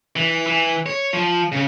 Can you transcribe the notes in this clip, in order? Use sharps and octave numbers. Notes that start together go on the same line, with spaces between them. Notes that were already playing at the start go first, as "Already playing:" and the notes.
E3
E3
C#5
F3
C#3